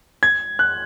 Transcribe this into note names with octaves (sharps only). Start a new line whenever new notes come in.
G#6
F#6